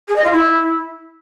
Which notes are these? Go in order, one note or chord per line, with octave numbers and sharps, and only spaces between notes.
G#4
D#5
F4
E4